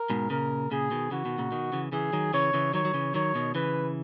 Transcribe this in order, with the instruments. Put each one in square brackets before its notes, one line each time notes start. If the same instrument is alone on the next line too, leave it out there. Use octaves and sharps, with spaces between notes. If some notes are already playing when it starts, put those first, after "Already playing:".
Already playing: [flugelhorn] A#4
[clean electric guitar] G#2 B2
[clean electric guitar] A#2 C#3 [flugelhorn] A#4
[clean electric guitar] A#2 C#3 [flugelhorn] G#4
[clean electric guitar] B2 D#3
[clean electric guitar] C#3 E3 [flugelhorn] F#4
[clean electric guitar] B2 D#3
A#2 C#3
B2 D#3
C#3 E3
[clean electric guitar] C#3 E3 [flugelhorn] G#4
[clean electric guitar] D#3 F#3
[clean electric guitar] C#3 E3 [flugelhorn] C#5
[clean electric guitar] C#3 E3
[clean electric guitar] D#3 F#3 [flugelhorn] C#5
[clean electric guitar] F#3
C#3 E3
[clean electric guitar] D#3 F#3 [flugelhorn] C#5
[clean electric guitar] B2 D#3
[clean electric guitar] C#3 E3 [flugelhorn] B4